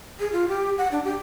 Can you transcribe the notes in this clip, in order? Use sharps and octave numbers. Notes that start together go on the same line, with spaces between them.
G#4
F4
G4
F#5
D4
G4